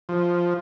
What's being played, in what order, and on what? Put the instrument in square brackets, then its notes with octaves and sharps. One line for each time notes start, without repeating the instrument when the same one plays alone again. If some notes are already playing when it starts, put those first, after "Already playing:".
[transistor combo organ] F3